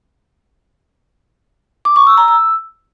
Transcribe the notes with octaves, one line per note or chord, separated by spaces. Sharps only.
D6
C#6
E6
A#5
E6